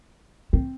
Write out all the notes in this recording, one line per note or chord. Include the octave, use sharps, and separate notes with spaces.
C4